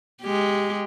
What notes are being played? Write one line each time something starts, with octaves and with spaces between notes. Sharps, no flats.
G#3 G4